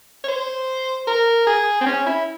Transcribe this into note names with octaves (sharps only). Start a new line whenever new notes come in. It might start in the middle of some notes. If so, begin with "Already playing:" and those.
C#5
C5
A#4
G#4
C4
C#4
E4